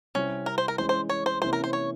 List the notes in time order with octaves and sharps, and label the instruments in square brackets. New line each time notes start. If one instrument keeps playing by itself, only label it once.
[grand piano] C3 G3 C4 E4 [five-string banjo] C#4
[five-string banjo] A#4
C5
A#4
[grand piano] E3 G#3 C#4 E4 [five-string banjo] C5
[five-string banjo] C5
C#5
C5
[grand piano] C3 E3 A#3 C#4 E4 [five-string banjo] C5
[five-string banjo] A#4
C5
C#5